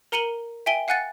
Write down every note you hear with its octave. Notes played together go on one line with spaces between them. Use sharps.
A#4 A#5 C#7 D#7 F#7 G7
E5 G5 G#5 D7 G7
F5 F#5 G#5 F#6 A6 C#7